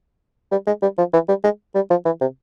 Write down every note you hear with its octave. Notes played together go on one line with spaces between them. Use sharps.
G3
G#3
G3
F3
E3
G3
G#3
G3
F3
E3
C3